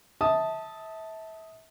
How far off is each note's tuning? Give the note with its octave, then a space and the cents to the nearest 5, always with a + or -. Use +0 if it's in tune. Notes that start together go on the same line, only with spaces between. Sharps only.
E5 -30 A5 +0 D#6 +0